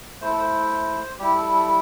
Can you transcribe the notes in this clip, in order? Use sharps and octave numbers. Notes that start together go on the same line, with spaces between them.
A3 E4 C5
A4
C5
G3 E4 G4
A4
A4